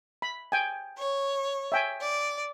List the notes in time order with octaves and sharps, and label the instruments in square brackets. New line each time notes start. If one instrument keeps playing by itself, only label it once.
[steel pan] B5
G5 G#5
[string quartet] C#5
[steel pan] E5 G5 G#5
[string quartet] D5